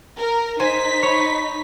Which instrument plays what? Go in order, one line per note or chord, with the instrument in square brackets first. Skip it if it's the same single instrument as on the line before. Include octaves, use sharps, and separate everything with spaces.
[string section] A#4
[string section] D#4 B6 [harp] C5 G#5
[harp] C#5 B5